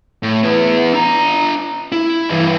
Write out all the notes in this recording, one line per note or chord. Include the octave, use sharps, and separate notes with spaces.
A2
B3 E4
D4 A#5
E4
G2 E3